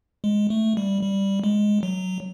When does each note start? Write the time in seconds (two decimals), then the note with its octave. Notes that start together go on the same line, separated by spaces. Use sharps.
0.24 G#3
0.50 A3
0.77 G3
1.03 G3
1.44 G#3
1.83 F#3